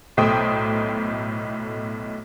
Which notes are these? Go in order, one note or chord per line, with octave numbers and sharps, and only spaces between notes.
B1 A2 A3 C5 G5 D#6